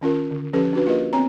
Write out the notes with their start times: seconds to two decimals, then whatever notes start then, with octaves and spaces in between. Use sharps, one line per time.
0.01 D#3 C#4 F4 A#4
0.31 D3
0.53 F3 C#4 G4 A4 B4
0.73 D4 F#4 B4
0.86 A#3 F4 G4 A#4 B4 D#5
1.13 B3 C4 C#5 A#5